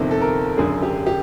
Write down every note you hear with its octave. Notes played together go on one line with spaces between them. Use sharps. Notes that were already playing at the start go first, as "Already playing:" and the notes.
Already playing: G1 F2 C3 D#3
A4
A#4
G#1 F#2 D3 G#4
G4
G4